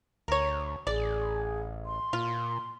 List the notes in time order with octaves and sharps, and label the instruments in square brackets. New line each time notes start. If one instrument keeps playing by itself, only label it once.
[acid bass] D2 [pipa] A#4 C#5
[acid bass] A1 [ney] G#4 [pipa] D5
[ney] C6
[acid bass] A#2 [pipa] F4